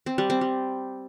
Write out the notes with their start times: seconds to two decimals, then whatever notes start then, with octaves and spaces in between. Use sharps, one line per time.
0.06 C4
0.18 G3
0.30 C4
0.41 G3